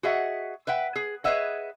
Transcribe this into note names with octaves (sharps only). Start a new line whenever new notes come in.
F#4 G#4 D#5 E5 F#5
B4 E5 F#5 G5
G#4
G#4 B4 C#5 D#5 E5 F#5